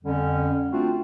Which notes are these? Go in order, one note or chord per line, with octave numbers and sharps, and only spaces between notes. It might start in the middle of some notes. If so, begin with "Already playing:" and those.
F2 D3 G3 C#4
A3 C4 D4 F4 F#4